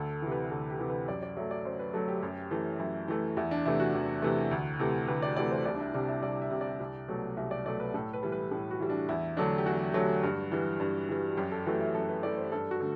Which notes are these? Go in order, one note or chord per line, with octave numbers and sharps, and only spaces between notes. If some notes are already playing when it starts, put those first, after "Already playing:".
Already playing: D2 A4
C3 E3
B4
D2 A4
G4
C3 E3
B4
F#2 D5
D5
F#3 A3 E5
D5
F#2 C5
B4
F#3 A3 A4
G4
F#2
E3 A3
F#2 E4
E3 A3
E2 E4
D4
C3 E3 A3 E4
F#4
E2
C3 E3 A3
D2
C3 E3 A3
D2 B4
D5
C3 E3 A3 D5
C5
C2 D5
D4
E4
C3 G3 D4
E4
C2 D5
E5
C3 G3
D5
C2
B2 F#3 A3
C2 E5
D5
B2 F#3 A3 D5
B4
A2 A4
B4
E3 G3
B4
A2
F#4
E3 G3
D4
E2 E4
D3 F#3 A3 D4
G4
E2 F#4
D3 F#3 A3
G2
E3 G3
G2
E3 G3
F#2 G4
A4
E3 A3 F#4
E4
F#2 A4
B4
E3 A3 D5
C5
G2 A4
F#4
D3 A3